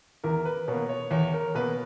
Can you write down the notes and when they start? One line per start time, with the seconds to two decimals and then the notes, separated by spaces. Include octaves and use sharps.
0.24 E2 A#4
0.45 B4
0.68 B2 A#3 C#5
0.89 C#5
1.11 E2 C#5
1.34 A#4
1.55 B2 A#3 B4